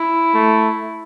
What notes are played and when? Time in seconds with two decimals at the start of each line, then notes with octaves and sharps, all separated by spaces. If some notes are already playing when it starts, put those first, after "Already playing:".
Already playing: E4
0.34 A3